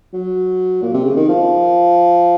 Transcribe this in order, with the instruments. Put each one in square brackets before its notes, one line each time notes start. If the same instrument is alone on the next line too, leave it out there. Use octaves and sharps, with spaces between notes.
[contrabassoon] F#3
A#2
C3
C#3
D#3
F3